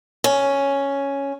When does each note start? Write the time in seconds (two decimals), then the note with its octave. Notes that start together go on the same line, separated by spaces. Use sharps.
0.24 C#4